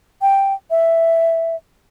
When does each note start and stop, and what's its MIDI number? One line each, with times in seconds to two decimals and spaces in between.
0.22 0.54 79
0.71 1.56 76